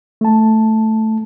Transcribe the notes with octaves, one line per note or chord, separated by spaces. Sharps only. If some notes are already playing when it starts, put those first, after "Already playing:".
A3 A5